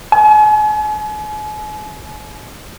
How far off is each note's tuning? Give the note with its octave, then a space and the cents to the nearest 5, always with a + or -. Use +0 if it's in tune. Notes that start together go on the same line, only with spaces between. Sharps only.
G#5 +40